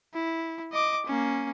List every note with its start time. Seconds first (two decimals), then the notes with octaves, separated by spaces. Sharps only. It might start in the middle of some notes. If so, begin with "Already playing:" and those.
0.14 E4
0.72 D#5 D6
1.06 A#3 C#4